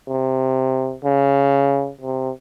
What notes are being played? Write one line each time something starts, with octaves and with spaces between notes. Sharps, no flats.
C3
C#3
C3